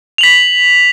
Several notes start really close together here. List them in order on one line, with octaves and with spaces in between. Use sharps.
F7 F#7 B6